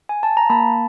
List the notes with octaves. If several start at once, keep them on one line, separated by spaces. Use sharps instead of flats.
G#5
A5
A#5
A#3 A5 B5